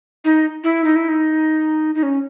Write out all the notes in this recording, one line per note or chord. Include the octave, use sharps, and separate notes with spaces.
D#4
E4
D#4
E4
D#4
D#4
C#4